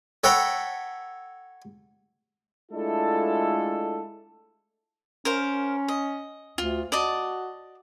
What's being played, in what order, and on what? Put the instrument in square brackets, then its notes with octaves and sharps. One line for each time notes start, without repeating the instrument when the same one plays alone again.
[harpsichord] A4 C#5 F#5 G5 A#5 B5
[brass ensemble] G#3 A3 D4 E4 F4 A4
[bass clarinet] C#4 [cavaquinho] A#4 C5 F5
[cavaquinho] D#5
[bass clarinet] D2 [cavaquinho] F4
[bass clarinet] F#4 [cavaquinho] D5 D#5 A5